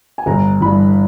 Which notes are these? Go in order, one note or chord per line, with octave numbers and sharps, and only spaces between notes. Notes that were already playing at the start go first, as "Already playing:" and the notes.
G#5
G1 A#5
G2 E3 B5